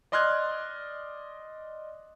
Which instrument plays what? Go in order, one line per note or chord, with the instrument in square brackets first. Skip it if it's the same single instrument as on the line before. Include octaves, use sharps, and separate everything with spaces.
[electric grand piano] D5 D#5 C6 F6 F#6 G#6